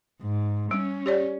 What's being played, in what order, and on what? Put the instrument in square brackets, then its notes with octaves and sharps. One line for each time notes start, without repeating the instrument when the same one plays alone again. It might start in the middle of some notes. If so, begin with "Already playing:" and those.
[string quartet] G#2
[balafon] G3 [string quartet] C#4
[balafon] G4 C#5 D5